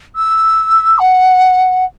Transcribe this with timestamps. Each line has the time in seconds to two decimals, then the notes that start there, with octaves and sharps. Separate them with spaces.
0.15 E6
0.99 F#5